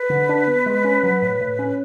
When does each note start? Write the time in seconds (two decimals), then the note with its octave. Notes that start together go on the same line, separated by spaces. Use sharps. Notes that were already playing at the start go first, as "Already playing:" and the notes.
Already playing: B4
0.10 D3
0.29 D4
0.47 B3
0.66 G#3
0.84 C#4
1.03 F#3
1.22 A2
1.40 A2
1.59 C#4